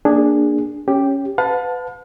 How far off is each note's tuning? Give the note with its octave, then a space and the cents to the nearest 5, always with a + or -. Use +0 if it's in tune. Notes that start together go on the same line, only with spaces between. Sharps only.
A#3 +0 D4 +0 G#4 -15
C#4 +0 G4 +0
B4 +25 F5 +45 A5 +0